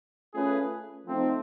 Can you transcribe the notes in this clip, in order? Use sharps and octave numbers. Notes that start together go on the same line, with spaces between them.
A3 C#4 F4 G#4 B4
F3 A3 C4 D#4